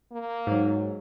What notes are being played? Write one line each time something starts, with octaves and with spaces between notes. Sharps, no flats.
A#3
G#2 F#3